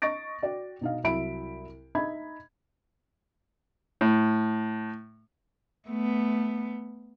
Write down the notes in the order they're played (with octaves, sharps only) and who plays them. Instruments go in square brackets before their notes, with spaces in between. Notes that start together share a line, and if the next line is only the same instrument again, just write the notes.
[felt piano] D#5 C#6 A6 A#6 D7
F#4 D5 G5
B2 D#4 F5
C2 F#3 E4 E5 B5 D7
D#4 E5 B5 G#6
[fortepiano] A2
[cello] A3 B3